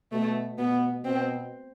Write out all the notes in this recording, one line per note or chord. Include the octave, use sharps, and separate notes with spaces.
B2 A3
B2 B3
B2 C4